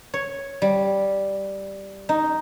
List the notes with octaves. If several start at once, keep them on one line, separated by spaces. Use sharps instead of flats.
C#5
G3
D#4